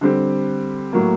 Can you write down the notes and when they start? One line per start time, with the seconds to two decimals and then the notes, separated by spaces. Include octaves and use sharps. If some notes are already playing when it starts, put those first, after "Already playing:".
0.01 D3 G3 C4 G4
0.93 A2 F#3 A#3